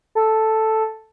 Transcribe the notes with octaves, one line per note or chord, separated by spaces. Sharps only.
A4